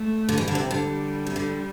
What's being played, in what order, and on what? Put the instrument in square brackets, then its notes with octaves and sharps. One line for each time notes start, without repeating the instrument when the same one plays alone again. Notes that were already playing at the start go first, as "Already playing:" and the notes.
Already playing: [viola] A3
[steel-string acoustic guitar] D3
[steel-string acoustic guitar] E3 [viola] G3
[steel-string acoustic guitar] D3
C3
D3
[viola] G3
[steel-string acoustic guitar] C3
D3